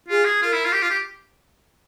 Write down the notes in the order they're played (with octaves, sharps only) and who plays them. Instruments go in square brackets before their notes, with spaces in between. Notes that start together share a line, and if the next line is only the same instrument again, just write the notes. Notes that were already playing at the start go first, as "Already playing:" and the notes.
[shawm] F4 [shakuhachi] G#4
[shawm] G#4
[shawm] F4 [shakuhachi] A#4
[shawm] E4
F4
G4
F4
G4